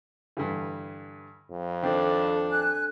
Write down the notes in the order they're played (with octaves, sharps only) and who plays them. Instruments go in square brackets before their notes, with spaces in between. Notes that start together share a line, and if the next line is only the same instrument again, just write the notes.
[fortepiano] G2 D3 E3
[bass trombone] F2
[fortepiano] D#3 C4 [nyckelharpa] D4 A4
[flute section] G#5 F#6